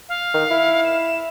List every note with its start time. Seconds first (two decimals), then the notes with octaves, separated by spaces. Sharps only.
0.09 F5
0.34 D#3
0.51 E4
0.85 E7